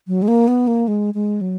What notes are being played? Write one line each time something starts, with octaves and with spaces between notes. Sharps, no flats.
F#3
G#3
A#3
B3
A#3
G#3
G#3
F#3